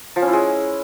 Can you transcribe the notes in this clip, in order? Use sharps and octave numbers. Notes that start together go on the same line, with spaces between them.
F3
C#4
E4
G#3